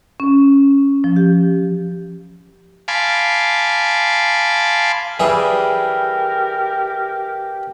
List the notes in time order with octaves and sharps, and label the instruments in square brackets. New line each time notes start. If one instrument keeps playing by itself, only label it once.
[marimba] C#4
F3
G4
[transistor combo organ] F5 G#5 A5 B5 C6 D6
[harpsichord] E3 G3 G#4 [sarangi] G4 [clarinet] A#4